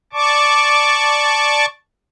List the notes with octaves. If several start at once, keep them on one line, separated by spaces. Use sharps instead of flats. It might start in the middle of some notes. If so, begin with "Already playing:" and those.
D5 A5 C#6 D6